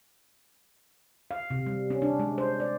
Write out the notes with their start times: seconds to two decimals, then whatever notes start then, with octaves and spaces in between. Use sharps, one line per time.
1.31 F5
1.50 C3
1.66 G3
1.90 C#4
2.02 D4
2.19 G#3
2.38 C5
2.60 D5